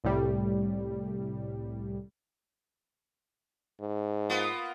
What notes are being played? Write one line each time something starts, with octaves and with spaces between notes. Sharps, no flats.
C2 A2 G3
G#2
A#3 B3 F4